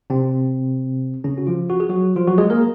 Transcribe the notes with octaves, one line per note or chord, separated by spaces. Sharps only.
C3 C4
C#3 C#4
F#4
F3 F4
F#4
G#4
F#3 F#4
F3 F4
F#3 F#4
G#3 G#4
A#3 A#4